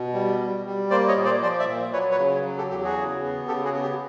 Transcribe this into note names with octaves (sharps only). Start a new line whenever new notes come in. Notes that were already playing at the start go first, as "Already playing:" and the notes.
Already playing: B2
G3
G3
G3
A#3 C5 D5
C#5 D#5
A#2
C5 D5
F3 C5 D5
D5 E5
A#2
F#3 B4 C#5
B4 C#5
C#3
F#3
G4 A4
E2 G4
F#4 G#4
C#3
B3
C#3 G4 A4
F#4 G#4
B3
G4